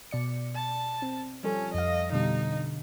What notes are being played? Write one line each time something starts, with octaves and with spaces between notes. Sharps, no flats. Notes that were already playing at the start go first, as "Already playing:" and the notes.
B2 D5 C#7
A5
C4
F3 G3 C#4 A4
F2 D#5 F5
B2 D3 G3 D#4